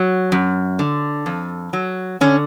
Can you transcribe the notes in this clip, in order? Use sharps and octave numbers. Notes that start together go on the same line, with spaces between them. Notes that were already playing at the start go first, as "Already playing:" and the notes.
Already playing: F#3
F#2
D3
F2
F#3
D3 C#4